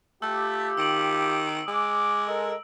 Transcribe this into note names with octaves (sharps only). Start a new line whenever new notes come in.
A3 F4 G4 E6
D#3 E6 D7 F#7
G#3 D6
A4 A#4 D#5